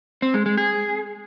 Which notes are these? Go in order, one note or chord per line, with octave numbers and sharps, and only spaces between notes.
C4
G#3
G#3
G#4